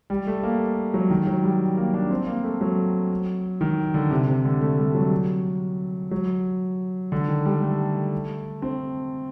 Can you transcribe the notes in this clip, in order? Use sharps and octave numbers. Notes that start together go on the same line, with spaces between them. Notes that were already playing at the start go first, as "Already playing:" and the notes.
G3
A3
A#3
F#3
D#3
F#3
G3
A#3
D4
C4
A#3
A3
F#3
D#3
D3
C3
C3
D3
A3
G3
F#3
F#3
D3
D#3
G3
A3
C4